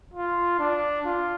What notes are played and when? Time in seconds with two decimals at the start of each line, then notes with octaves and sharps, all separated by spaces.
0.14 F4
0.59 D4
1.06 F4